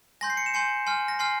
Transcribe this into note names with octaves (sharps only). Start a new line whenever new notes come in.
G#5 C6 G6 A#6
C7
C#7
E7
G#5 C6 G6 C#7
G#5 C6 F6
A#6
G#5 C6 F6 C7